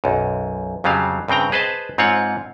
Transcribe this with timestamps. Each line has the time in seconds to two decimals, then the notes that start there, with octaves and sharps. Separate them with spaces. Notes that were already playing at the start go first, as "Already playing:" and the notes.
0.04 B1 F#2
0.84 F2 C#3 F#3 G3 F5
1.28 G2 C#3 C4 G5 A#5
1.52 G#4 B4 C5 D#5 A5
1.98 G#2 C4 F4 C#5 F#5